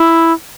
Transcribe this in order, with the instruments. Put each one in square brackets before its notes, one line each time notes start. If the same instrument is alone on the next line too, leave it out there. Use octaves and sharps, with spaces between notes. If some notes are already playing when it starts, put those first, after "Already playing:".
Already playing: [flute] E4